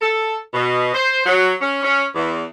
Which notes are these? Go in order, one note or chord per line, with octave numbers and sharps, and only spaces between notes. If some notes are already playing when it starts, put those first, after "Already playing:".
A4
B2
C5
F#3
C#4
C#4
E2